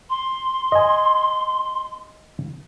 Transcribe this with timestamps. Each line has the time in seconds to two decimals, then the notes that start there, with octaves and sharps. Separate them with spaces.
0.10 C6
0.72 D#5 G#5